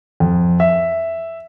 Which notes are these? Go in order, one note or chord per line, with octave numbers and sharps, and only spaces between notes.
F2
E5